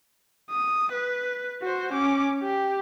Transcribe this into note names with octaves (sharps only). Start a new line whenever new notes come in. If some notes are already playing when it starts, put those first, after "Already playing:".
D#6
B4
F#4 C5
C#4 D6
G4